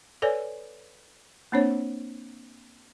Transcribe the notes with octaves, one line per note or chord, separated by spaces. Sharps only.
A4 B4 C#5 D5 G#5
A#3 C4 D4 C5 C#5